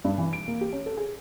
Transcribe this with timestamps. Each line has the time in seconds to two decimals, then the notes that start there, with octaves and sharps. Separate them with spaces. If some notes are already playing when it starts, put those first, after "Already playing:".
0.04 G2
0.18 E3
0.33 D7
0.48 A#3
0.61 G4
0.73 C#4
0.86 A4
0.97 G#4